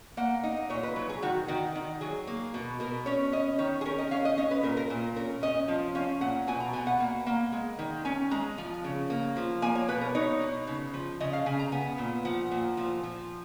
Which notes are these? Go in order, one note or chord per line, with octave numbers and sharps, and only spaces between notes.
A#3 F#5
D#4
A#2 C#5
B4
F#3
G#4
D#3 F#4
D#3 F#4
D#3
F#3 G#4
A#3
B2
B2 A#4
C#4 C#5
C#4 D#5
D#3 C#5
G#4
C#4 A#4
D#5
C#4 F5
D#5
C#4 D#5
B4
A#2 A#4
A#4
A#2
C#4 A#4
C#4 D#5
F3
C#4 F5
A#2 F#5
B2 G#5
A#5
B2 G#5
F#5
A#3
A#3
G#3
D#3
C#4 G#5
G#3 A#5
F3
C#3
A#3
F3
A#3 G#5
C#5
B2 B4
A#4
D#4 C#5
B2
C#3
F3
C#3 D#5
F5
C#3 G#5
A#5
B3 G#5
A#2
F3 F#5
A#2
F3
F3